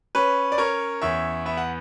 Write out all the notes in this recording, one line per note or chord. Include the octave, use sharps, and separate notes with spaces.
C#4 B4
D5
C#4 A#4 C#5
E2 C#5 E5
B3 E5
F#5